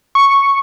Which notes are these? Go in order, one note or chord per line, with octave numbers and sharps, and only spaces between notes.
C#6